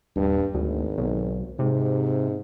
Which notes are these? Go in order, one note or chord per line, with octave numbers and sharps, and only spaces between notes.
D#1 G2
G#1 D2
B1
G#2 C3